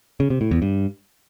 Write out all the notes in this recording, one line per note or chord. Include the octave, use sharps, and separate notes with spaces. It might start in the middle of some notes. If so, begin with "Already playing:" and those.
C#3
C3
A2
E2
G2